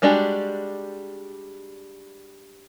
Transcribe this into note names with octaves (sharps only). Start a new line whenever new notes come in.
G3 G#3 D4 F#4 G4